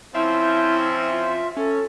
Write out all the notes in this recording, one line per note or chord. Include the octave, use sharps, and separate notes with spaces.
F3 C4 C#4 E4 E5
F4
C#4 A4